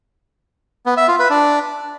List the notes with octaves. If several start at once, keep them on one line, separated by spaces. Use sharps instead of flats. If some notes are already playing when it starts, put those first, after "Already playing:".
B3
E5
F4
B4
D4